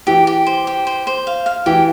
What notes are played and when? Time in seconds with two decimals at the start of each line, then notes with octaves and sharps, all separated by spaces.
0.07 E3 G4
0.27 G4
0.47 C5
0.67 G4
0.87 C5
1.07 C5
1.27 F5
1.46 F5
1.66 E3 G4